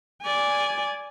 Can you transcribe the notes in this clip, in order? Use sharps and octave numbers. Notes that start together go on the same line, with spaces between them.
D5 G#5